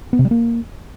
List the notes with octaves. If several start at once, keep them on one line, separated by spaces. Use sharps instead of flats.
B3
C3
G3
A#3